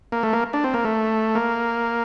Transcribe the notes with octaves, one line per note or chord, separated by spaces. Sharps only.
A#3
A3
A#3
D4
C4
A#3
A3
A#3